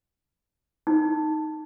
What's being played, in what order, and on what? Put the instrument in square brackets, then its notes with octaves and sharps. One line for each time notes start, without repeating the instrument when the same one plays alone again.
[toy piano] D#4